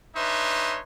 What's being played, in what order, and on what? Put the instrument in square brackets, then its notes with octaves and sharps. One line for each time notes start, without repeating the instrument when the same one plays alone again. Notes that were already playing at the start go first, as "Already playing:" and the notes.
[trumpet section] D4 D#4 B4 C#5 E5 C6